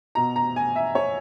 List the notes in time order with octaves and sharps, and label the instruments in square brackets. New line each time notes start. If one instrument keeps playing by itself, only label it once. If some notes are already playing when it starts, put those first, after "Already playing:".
[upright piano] B2 A#5
A#5
G#5
E5
C#5